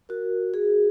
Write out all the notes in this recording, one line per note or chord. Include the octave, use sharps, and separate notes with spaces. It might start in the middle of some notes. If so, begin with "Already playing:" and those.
F#4 A#4
F#4 G#4